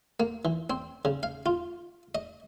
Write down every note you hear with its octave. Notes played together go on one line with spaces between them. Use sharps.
A#3
E3
C4
C#3
F5
F4
D#5